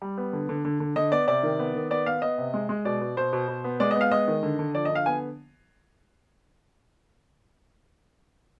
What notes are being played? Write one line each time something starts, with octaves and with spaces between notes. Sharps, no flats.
G3
B3
D3
D3
D3
D3
D3 D#5
B3 D5
C3 D5
D#3
B3
D#3
B3 D5
B3 F5
B3 D#5
C3
G#3
G#3
B2 D5
B2
B2 C5
B2
B2
B3
G#3 D5
D#5
B3
F5
G#3 D#5
D#3
D3
D3
F3 D5
D#5
D3
F5
B3 G#5